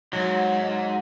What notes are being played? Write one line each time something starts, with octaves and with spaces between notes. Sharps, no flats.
G#2 F#3